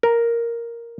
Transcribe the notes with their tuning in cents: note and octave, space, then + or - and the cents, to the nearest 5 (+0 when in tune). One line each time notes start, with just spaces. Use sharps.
A#4 +0